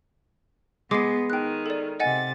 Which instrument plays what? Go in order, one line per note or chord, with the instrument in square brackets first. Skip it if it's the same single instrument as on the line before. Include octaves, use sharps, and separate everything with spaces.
[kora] G#3 [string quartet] B3 [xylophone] D6 C7
[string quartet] D#3 [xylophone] G5 F#6
[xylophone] A4 D5
[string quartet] C3 A6 [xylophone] D#5 F#5 G#5